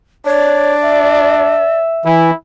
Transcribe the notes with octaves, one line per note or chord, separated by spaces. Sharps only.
D4 C#5 D5
E5
E3 E4